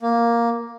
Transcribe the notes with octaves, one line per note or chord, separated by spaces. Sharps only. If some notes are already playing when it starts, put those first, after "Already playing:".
A#3